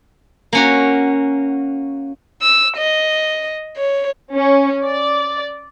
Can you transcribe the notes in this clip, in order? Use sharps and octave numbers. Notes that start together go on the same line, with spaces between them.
A#3 C#4 F#4
E6
D#5
C#5
C#4
D5